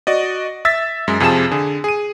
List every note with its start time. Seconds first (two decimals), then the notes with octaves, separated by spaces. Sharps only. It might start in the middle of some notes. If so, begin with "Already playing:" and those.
0.07 F#4 D5 D#5
0.65 E5 E6 A6 B6
1.08 F#2 G#3
1.20 F2 C3 F4 G#4 A5 E7
1.51 D3 G#4
1.84 G#4 D#7